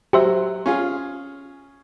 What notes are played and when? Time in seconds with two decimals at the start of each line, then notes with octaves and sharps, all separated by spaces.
0.13 F#3 G4 C5 E5
0.66 C#4 F4 G#4